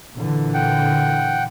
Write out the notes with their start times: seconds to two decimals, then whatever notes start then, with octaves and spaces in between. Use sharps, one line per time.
0.15 A#2 D3 E3
0.54 F#5 G5